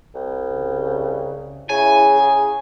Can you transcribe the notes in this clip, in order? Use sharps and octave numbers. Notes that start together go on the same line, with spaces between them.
C2
C#3
C#3 E4 G#5
G#4